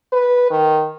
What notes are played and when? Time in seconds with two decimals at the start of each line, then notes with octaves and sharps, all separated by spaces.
0.13 B4
0.51 D#3